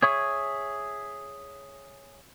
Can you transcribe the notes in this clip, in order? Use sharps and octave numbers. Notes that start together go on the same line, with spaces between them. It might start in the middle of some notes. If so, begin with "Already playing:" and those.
G#4 C#5 E5 C#6 D#6